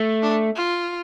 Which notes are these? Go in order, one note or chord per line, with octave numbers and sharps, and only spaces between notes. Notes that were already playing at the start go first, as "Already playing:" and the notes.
Already playing: A3
D4
F4